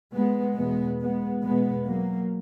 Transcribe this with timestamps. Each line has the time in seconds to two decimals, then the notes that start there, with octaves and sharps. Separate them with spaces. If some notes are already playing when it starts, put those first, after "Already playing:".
0.14 G#3 B3
0.57 E2 B2 G#3 B3
1.00 G#3 B3
1.43 E2 B2 G#3 B3
1.87 F#3 A#3